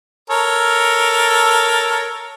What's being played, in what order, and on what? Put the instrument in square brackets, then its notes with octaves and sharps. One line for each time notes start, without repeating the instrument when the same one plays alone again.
[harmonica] A4 A#4 C#5